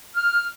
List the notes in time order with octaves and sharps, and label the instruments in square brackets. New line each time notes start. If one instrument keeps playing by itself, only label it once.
[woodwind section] F6